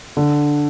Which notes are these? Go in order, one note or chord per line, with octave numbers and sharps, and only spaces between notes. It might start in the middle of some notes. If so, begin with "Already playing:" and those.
D3